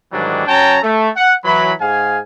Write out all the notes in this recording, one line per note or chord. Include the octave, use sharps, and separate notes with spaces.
G#2 D#3 E3 F#3 G3 D4
F#3 C#4 C#5 G5 A5 A#5
A3
F#5
E3 F#3 B5
G#2 G#4 F5 G#5